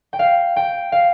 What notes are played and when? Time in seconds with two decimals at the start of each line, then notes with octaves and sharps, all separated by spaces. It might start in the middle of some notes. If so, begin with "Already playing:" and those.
0.13 G5
0.19 F5
0.56 G5
0.92 F5